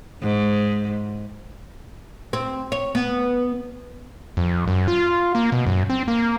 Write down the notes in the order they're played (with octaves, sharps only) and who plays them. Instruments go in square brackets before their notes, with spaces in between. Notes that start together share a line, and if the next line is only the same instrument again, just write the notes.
[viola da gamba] G#2
[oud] C4
C#5
B3
[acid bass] F2
F#2
F4
A#3
B2
F#2
C4
A#3